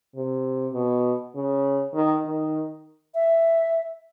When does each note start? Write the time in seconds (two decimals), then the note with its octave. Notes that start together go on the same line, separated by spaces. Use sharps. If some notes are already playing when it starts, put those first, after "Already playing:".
0.16 C3
0.73 B2
1.35 C#3
1.94 D#3
2.26 D#3
3.15 E5